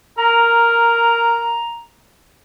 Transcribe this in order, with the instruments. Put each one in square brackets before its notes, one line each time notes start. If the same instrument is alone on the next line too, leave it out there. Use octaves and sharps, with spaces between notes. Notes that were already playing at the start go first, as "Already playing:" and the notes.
[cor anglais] A#4 [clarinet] A#5